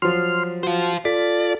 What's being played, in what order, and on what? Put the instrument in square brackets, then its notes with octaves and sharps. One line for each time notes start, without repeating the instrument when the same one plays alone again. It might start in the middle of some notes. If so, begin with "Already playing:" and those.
[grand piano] F3 F#3 [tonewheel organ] C6 F6
[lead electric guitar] F4 C5 [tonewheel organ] F#4
[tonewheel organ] F4 A4 [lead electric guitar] D5 [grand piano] B6